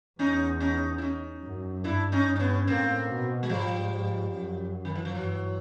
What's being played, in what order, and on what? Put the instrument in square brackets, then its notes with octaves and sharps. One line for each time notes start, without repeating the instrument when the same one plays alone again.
[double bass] E2 [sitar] C#4 D#4
[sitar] C#4 D#4
E4
C#4 D#4
[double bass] F#2
[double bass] G2 [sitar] D4 E4
[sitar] C#4 D#4
[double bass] G2
[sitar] D4
B3 C#4
[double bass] A2 [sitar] A#3 C4
[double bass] B2
[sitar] G#3
[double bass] G#2 [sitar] F3 G3
[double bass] F#2
[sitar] D#3
E3
F3
[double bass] G2 [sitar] E3 F#3